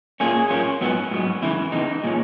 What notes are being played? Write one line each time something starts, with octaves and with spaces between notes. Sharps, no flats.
A#2 A#3 C#4 G#4
A#2 A#3 C#4
G#2 F#3 B3
G#2 F#3 B3
E2 C#3 E3 E4
E2 C#3 E3 D#4
A#2 G#3 C#4